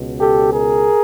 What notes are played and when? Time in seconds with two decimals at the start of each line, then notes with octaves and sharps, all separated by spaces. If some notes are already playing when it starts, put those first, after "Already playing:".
Already playing: C#2 B2
0.19 G4 A4
0.52 G#4 A#4